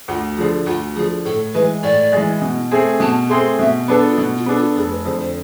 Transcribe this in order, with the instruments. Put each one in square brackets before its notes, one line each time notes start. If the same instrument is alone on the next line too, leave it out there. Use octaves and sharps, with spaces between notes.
[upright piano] D2 [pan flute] F4
[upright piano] D3 F3 [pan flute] G#4
[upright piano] D2 [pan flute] F4
[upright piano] D3 F3 [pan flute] G#4
[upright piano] A2 [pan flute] A4
[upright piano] E3 G#3 [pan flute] B4
[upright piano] A2 [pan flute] D5
[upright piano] E3 G#3
B2
A3 C4 G#4
[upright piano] B2 [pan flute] A5
[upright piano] A3 C4 G#4 [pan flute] C6
[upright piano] B2 [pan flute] E5
[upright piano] B3 D4 A4 [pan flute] B4
[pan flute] F4
[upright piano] B2 [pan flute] E4
[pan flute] F4
[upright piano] B3 D4 A4
[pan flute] F4
[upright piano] F1 [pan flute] G#4
[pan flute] B4
[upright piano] F2 D3 [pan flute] C5
[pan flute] C5